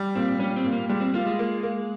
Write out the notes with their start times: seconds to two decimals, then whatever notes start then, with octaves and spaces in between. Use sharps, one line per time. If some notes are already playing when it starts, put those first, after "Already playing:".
Already playing: G3
0.15 A#2 C4
0.39 G3 C#4
0.56 C4
0.64 A#2
0.73 A#3
0.89 G3 G#3
1.01 C4
1.14 A#3 F4
1.26 G#3
1.39 A#3
1.63 A#3